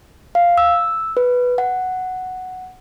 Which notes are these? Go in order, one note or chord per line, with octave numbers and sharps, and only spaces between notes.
F5
E6
B4
F#5